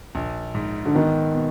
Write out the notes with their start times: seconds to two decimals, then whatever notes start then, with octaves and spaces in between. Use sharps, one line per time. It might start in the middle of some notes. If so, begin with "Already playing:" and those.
0.15 A#1
0.55 G#2
0.85 D3
0.95 D#3 B3
1.35 B2